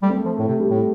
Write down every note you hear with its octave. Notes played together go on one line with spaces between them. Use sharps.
G3 A3
C4
A3
F3
A2 A3
C3
G3
A2 A3